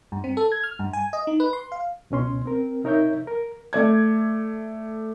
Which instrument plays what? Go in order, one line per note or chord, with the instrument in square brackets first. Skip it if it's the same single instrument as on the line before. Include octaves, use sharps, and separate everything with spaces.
[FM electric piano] G2
C4
A4
G#6
F6
G2
G#5
D#5
D#4
B4
C6
F5
[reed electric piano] C#2 B2 C#4 C6
C4 A#4
C3 D#4 A#4 C#5 E5 G6
A#4
[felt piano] A3 D5 G#6